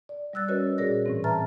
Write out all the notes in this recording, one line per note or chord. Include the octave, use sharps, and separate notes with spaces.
D5
G3 D5 E6 F#6 A6
C#4 F#4 A#4 B4 C#5 D#5
A#2 F#4 G#4 A#4 D5 A#6
A2 E3 C4
B4 E5 A5 A#5 F6 A6